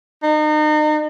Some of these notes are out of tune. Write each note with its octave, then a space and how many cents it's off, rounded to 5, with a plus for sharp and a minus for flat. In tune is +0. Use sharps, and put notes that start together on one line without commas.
D#4 -35